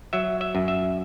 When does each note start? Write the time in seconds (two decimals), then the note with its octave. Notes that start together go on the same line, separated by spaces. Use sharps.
0.13 F#3 E5
0.41 E5
0.55 F#2
0.68 E5